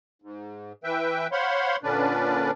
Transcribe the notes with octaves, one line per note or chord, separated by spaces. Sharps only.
G#2
E3 B4 E5 G5
C5 C#5 F5 F#5 B5 C6
A#2 D3 C#4 D4 B4 D5